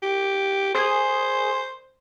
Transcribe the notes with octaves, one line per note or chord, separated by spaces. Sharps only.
G4
G#4 C5